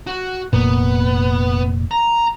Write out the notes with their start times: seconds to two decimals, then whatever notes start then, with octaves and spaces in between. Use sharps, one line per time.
0.07 F#4
0.53 F1 A#2 B3
1.91 A#5